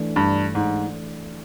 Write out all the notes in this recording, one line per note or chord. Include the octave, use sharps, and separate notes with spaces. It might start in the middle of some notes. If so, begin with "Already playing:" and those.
Already playing: E3 A3 D4
G2
G#2